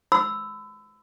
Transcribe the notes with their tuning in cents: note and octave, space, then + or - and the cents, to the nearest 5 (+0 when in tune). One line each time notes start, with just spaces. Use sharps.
B5 +35 E6 +0